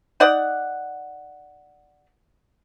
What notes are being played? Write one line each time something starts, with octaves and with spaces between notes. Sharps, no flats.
D#4 D5 F#5